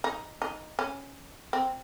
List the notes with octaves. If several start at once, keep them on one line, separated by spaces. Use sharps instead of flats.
D#4
D#4
C#4
C4